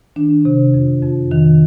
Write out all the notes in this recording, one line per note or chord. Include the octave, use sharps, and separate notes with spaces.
D#3 D4
C3
F2
F2
D#3